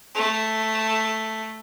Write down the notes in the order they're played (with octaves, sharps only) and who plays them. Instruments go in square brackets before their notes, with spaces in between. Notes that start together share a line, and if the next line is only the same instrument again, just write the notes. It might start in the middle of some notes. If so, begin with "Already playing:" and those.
[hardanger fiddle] A3